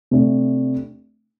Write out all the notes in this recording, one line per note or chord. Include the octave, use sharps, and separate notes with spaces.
C3 A3 D4